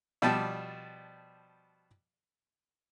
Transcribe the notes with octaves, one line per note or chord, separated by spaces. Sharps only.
B2 F3 G3 D5 G5 A5